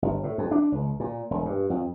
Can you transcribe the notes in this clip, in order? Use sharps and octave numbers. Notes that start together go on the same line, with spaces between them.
G1
A2
F2
D4
C#2
A#2
E1
G2
F2